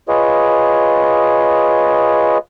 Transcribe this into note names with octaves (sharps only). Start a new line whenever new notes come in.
F4 G#4 B4 C#5 D#5